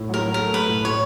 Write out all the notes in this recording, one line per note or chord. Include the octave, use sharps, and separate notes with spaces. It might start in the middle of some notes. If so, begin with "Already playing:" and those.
Already playing: A2
F#3 A#4
F#3
A#4
A3
A3 B4
A2
A2 C#5